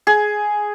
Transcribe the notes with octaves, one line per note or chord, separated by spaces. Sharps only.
G#4